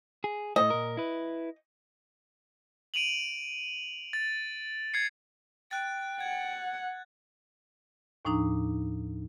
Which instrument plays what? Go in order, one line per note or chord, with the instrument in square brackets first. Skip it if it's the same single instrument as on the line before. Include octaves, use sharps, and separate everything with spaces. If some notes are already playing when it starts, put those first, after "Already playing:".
[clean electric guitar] G#4
[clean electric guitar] A2 A3 [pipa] D#5
[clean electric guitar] A#2 A#4
E4 B4
[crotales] D7 D#7 F7 F#7
A6
G#6 C7 C#7
[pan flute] G5 [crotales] F#6 A6
[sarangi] F#5 [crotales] G#6
[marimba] D#2 A2 F3 D4 D#4 A#5